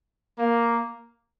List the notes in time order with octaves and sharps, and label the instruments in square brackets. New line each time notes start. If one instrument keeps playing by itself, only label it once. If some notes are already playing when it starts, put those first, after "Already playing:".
[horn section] A#3